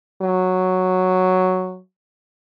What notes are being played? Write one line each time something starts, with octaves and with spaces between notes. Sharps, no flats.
F#3